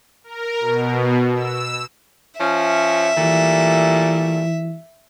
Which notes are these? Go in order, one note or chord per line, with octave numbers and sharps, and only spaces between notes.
A#4
B2
E6
F3 C#4 E5
A#2 E3 G3 A3